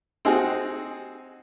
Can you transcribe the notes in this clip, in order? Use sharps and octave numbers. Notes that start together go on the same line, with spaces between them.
C4 D#4 F#4 G#4